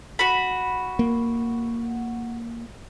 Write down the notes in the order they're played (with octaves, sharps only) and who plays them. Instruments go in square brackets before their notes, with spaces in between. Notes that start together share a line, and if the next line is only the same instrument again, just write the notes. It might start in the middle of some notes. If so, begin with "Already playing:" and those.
[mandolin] F#4 B5
[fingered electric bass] A#3